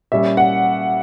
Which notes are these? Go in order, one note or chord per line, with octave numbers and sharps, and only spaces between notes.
A#2 G3 C#4 E5
F#5